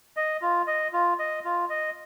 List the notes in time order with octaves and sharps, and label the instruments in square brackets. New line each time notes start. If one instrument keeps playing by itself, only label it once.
[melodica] D#5
F4
D#5
F4
D#5
F4
D#5